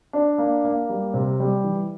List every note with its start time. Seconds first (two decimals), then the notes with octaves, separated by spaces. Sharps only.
0.13 D4
0.38 A#3
0.64 A#3
0.89 G3
1.14 C3
1.40 G3
1.64 E3